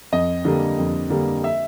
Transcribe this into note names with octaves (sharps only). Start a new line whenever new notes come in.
F2 D#5
D3 G3 A#3
F2
D3 G3 A#3
E5